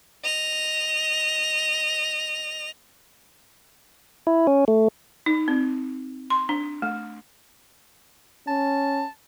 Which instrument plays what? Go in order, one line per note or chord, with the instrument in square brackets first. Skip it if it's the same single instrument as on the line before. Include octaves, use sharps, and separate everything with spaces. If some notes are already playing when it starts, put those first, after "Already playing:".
[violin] D#5 F7
[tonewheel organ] E4
C#4
A3
[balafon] D#4
C4
C6
D4
A3
[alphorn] C#4 [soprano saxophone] A5